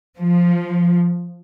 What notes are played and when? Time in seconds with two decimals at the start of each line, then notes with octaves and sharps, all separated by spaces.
0.18 F3